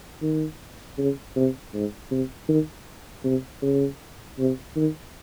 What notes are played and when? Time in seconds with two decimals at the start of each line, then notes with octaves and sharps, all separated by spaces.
0.22 D#3
0.98 C#3
1.36 C3
1.74 G#2
2.11 C3
2.49 D#3
3.24 C3
3.62 C#3
4.39 C3
4.76 D#3